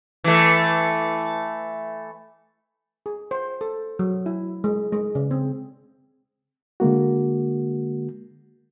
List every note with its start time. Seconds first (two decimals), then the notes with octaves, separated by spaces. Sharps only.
0.24 E3 A3
3.06 G#4
3.31 C5
3.61 A4
3.99 F#3
4.26 E4
4.64 G#3
4.93 G#3
5.15 C#3
5.31 C4
6.80 D3 G#3 A#3 F#4